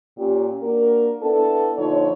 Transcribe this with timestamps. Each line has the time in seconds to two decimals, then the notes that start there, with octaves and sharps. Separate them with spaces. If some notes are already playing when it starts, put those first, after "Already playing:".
0.17 A#2 C#4 G4
0.62 A#3 D4 F#4 A#4
1.22 B3 D4 E4 A4
1.77 A#2 D3 F3 D#4 C#5